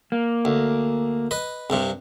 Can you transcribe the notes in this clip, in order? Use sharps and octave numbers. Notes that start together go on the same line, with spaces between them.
A#3
D2
B4 D#5
C2 G2 C3